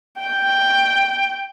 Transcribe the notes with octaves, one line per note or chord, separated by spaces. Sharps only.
G5